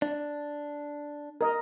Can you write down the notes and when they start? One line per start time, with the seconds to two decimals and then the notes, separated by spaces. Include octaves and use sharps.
0.02 D4
1.41 A#4 D#5